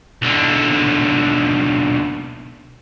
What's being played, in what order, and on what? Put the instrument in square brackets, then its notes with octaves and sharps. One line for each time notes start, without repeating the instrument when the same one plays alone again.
[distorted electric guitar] B1 D3